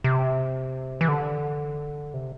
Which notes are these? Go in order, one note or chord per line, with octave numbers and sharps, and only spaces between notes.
C3
E3
D3
C3